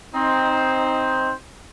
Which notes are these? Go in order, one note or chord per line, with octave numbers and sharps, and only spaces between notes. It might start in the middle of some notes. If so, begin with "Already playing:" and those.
C4 D#4 C5